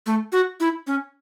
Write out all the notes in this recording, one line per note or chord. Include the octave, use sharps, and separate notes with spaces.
A3
F#4
E4
C#4